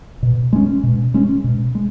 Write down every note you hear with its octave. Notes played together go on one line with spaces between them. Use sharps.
B2
G#3 C#4
B2
G#3 C#4
B2
G#3